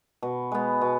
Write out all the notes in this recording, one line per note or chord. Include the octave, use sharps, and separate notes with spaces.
B2
G#3 B3
B2